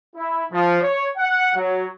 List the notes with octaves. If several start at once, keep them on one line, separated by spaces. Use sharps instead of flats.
E4
F3
C#5
F#5
F#3